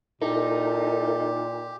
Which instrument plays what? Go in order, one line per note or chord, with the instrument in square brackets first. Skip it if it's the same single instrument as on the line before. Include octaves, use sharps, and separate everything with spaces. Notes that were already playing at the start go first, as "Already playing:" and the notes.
[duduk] A#2 [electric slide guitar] D#4 [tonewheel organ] E4 A4 A#4 [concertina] G4